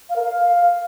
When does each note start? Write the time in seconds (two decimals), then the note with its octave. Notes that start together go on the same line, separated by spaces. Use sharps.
0.09 F5
0.16 A#4
0.22 F5